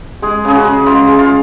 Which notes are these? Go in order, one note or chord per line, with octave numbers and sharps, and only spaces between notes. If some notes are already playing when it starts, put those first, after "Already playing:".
G#3 G#4
C#3 G#4
F#4
C#3
G#3 F4
G#3
F4